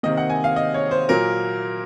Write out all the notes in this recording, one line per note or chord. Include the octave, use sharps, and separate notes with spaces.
C3 D#3 A#3 D#5
F#5
G#5
F5
D#5
C#5
C5
A#2 F#3 A#3 A#4